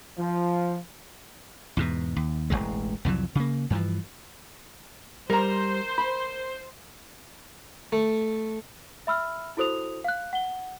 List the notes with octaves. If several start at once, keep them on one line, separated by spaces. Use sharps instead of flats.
F3
E2 G#2 B2
D#2
E1 A1 F2 G#3
C2 F2 E3 F#3
C#3 A#3
G2 E3 F3
G3 A#4 C5 A#5
B5
A3
E5 B5 E6 F6
E4 F#4 A4 C5 D#6 F7
F5 F#6
F#5 G7